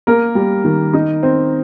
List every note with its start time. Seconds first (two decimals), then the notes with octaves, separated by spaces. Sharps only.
0.07 A#3 A#4
0.35 G3
0.64 D#3
0.94 D#4
1.23 C4